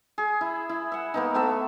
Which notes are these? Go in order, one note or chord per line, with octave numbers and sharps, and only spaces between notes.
G#4
E4
E4
E5 F#5
A#3 B3 D#4
A3 B3 A4 E5